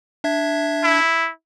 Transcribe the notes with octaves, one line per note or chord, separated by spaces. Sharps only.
D4 E5 G#6
E4